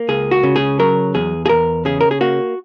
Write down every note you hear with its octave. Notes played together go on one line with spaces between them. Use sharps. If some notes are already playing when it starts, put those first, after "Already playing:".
Already playing: A#3
C#2 G#4
F#4
C#3
G#4
F#3 A#4
E2 G#4
G#4
E2 A#4
C#3 G#4
A#4
G#4
A#3 F#4